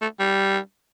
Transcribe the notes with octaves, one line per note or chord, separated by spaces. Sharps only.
A3
G3